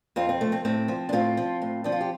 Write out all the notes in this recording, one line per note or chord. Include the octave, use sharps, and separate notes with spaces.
F2 C4 F4
C4
F3 A3
C4
A2 C4
F3
D4
A2 C4 F4
F3
A2
F3 D4
F4
G4